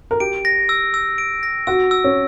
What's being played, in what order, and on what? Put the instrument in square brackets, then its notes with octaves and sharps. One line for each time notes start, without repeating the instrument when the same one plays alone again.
[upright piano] A#4
[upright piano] G4 [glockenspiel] D7
[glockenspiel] A#6
E6
E6
D7
A#6
[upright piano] F#4 [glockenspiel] E6
[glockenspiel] E6
[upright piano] C#4